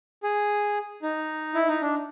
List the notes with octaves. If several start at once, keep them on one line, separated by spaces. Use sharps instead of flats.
G#4
D#4
E4
D#4
D4